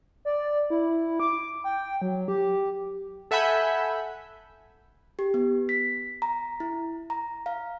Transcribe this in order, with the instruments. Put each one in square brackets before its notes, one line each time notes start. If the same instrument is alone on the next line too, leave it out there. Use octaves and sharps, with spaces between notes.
[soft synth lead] D5
E4
D6
G5
F#3
G4
[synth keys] A4 E5 F#5 G#5 B5 G6
[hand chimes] G4
B3
B6
A#5
E4
A#5
F5